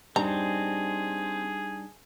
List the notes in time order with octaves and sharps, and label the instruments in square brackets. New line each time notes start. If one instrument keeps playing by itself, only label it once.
[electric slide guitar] G3 D4 D#4 [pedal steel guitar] C4 [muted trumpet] G#4 [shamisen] A#5